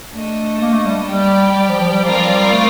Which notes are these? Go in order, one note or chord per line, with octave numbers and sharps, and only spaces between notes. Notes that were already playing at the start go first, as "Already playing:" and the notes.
A3 D4 A4 D#5
A#3
A3
G3
G3 G4 D5 G5
G3
F3
F3
G3
F3 C4 F4 A#4 D5 F5
G3
A3